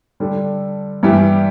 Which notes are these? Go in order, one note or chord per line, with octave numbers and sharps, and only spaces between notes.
D3 G3 D4 A4
G2 E3 G3 E4 G4